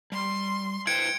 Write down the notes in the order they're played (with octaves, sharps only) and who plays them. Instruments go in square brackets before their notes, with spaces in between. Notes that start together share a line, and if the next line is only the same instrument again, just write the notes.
[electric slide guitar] G3 [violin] C6
[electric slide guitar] E4 B4 C5 [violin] G5 [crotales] G#6 C#7 D7